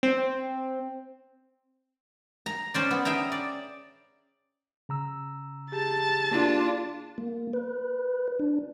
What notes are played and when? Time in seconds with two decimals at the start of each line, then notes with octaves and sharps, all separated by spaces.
0.03 C4
2.46 A#5
2.74 C#4 C5 D5
2.91 B3
3.05 G#4 E5 G5 A#5
3.32 D5
4.89 C#3 A#5 E6
5.72 G4 G#4 A5 A6
6.31 A#3 D4 F4
7.18 A#3
7.53 B4
8.39 D4